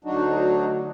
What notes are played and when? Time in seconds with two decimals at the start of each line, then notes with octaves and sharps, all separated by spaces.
0.04 D2 F#3 D4 D#4 F#4